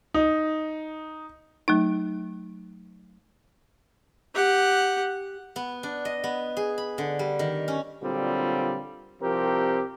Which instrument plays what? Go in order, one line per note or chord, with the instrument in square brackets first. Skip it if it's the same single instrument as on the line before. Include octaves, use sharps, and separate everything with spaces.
[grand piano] D#4
[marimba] F#3 A3 D#4
[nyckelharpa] G4 F#5
[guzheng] B3
D4
D#5
B3
G#4
B5
D3
G3
D#3
C#4
[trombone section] A#2 D3 F#3 G3 C4 F4
C2 F3 C4 G4 A#4